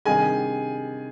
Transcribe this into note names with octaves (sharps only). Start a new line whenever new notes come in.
C3 D#3 G3 D4 G#4 G#5